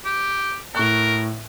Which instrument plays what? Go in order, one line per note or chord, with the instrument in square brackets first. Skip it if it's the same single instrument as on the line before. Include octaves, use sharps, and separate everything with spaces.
[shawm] G4
[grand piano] A2 C#6 F#6 [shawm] A#4